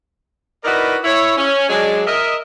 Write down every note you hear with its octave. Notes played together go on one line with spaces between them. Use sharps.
D#4 E4 F#4 A#4 B4 D5
E4 C#5
C#4
F#3 G#3 D4
A#4 D#5 E5